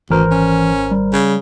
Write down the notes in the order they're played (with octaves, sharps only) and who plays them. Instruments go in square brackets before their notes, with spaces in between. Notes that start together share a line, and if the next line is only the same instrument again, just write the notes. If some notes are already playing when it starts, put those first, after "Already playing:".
[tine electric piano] G#1 A#4 C5 [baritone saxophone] D2 [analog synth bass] E3
[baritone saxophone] C#4
[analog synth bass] G3
[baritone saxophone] C#3